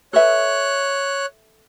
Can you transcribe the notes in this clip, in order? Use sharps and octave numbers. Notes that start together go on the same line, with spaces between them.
A4 B4 C#5 E5 F#6